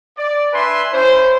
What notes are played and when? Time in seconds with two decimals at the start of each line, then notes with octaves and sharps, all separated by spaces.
0.18 D5
0.53 D4 B4 E5 G#5 C6
0.93 C#4 E4 C5